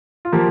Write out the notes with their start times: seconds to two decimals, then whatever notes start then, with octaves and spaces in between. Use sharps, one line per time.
0.25 F4
0.32 F3 A#3 G4